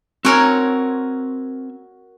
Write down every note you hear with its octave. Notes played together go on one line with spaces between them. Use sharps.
C4 F#4 A#4 C#5 G#5